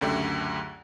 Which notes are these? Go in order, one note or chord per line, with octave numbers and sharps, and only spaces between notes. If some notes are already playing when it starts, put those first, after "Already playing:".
C#2 F#2 D3 A3 G4 E5